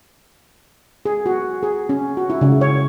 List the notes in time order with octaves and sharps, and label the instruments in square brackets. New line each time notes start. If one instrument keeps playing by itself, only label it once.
[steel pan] G#4
F#4
G#4
C#4
F#4
E4
C#3
C#5